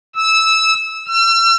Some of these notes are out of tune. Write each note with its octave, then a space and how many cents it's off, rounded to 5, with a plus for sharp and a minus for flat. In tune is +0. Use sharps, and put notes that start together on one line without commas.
E6 -15
E6 +45